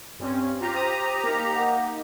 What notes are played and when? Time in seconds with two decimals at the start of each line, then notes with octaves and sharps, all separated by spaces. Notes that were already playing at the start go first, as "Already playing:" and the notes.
0.19 G2 C4 C#4
0.61 F4 G4 A#5
0.75 C5 D#6
1.24 A#3 D#4 A#4
1.55 F#5